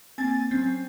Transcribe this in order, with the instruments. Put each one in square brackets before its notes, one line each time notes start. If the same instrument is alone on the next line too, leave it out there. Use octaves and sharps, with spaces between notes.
[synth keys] A#3 C4 [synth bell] G#5 A6
[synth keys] F#3 C#4 [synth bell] C4